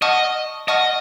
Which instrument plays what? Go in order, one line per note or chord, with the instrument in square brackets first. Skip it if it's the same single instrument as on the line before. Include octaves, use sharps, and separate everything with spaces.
[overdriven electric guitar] D#5 [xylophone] F#5 A5 C#6 F6
[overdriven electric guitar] D#5 [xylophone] F#5 A5 C#6 F6